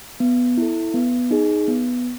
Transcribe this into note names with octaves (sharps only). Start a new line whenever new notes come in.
B3
E4 A4
B3
D#4 G#4
B3